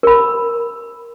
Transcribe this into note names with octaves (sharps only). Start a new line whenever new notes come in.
A#4 B5